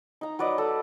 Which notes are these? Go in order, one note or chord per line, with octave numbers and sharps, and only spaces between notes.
D#4 A#5
F#3 B4 D5 D#5
A4